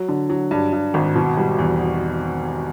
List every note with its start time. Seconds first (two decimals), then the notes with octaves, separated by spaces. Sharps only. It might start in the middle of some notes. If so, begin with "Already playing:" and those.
Already playing: F#3
0.09 D3
0.30 F#3
0.51 G2
0.73 G2
0.94 G#1
1.15 B2
1.37 G3
1.58 E2